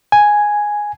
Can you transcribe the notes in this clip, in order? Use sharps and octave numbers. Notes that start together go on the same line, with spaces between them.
G#5